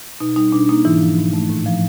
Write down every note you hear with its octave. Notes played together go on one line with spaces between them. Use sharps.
B2 D#4
G3 D#4
B2 D4
A#3 D#4
G#2 E3 E4
F3
G#2
A3
A2
F3